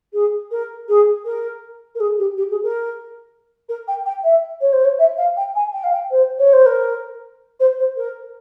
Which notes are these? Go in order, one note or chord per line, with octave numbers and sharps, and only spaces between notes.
G#4
A#4
G#4
A#4
A#4
G#4
G4
G4
G#4
A#4
A#4
G5
G5
E5
C#5
C5
C#5
E5
F5
G5
G#5
G5
F5
G5
C5
C#5
C5
A#4
C5
C5
A#4